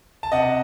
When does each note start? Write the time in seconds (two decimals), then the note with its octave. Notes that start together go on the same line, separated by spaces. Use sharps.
0.23 A5
0.32 C3 D#5 F#5